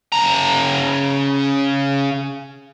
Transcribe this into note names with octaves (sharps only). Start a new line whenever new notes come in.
C#3 A#5